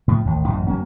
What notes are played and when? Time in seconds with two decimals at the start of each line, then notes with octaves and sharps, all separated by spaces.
0.08 A2 C#3 F3
0.25 A1 D#2 A2
0.47 A1 F#2 A#2 E3
0.67 F1 F#3 A#3 C#4